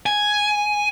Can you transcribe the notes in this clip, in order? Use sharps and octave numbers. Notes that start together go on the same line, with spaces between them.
G#5